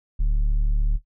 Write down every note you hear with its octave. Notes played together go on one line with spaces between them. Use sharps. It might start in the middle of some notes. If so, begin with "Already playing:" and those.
D1